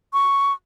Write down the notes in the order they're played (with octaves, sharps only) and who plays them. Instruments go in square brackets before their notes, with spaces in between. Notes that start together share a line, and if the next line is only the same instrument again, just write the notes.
[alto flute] C#6